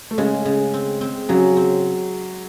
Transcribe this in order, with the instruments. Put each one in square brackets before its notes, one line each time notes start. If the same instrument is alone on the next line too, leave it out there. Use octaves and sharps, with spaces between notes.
[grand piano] A3
[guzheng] C#3 [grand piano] G#3
[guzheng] C#3
C4
C4
[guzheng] C#3 [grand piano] F#3
[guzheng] C4